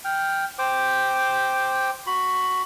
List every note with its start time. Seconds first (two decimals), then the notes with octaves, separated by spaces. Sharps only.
0.05 G5 F6
0.59 C5 G5 D6
2.07 F#4 B5